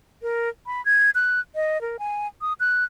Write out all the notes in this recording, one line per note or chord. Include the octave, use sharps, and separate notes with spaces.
A#4
B5
G#6
F#6
D#5
A#4
G#5
D#6
F#6